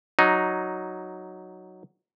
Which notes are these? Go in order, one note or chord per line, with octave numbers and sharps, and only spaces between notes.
F#3 D#4